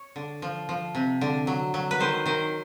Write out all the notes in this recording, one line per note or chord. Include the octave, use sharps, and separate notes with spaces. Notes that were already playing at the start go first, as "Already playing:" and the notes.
Already playing: C#5
D3
F3
F3
C3
D3
F#3
F#3
B4
D#3 C5
D#3 C5